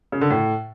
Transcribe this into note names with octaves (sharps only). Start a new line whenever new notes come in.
C#3
D3
A2